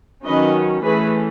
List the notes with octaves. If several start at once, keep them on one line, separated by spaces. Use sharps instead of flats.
D#3 F#3 C#4 B4 D#5
E3 A3 C#4 G#4 B4